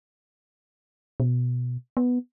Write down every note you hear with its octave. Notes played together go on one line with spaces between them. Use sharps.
B2
B3